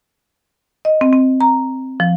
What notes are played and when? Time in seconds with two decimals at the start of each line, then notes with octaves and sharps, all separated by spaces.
0.85 D#5
1.01 C4
1.13 C4
1.41 A#5
2.00 F3